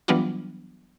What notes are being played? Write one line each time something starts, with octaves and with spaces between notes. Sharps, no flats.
E3 F#3 G3 B3 D4 F4